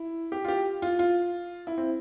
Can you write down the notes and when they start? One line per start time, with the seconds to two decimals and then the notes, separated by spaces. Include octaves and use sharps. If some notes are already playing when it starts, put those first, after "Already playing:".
Already playing: E4
0.32 G4
0.44 F4
0.48 G4
0.82 F4
0.99 F4
1.67 E4
1.78 C4